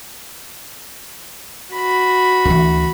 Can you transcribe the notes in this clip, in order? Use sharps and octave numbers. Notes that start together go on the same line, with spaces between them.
F#4 B5
D2 E3